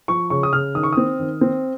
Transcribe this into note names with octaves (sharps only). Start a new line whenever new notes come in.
F3 C#6
C#3 C#6
D#6
C#3 F6
D#3 D#6
C#6
C4 D#6
D#3
C4